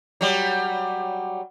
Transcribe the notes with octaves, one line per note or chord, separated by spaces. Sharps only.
F#3 G3